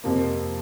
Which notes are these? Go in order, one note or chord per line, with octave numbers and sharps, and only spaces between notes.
F2 C3 F3 A#3